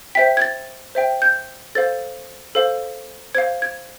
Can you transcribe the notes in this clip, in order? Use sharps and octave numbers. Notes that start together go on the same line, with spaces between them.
C5 E5 G5 B6
G#6
A6
C5 E5 G5
G6
A4 C5 F5 A6
A4 C5 F5
C5 F5 G#6
G#6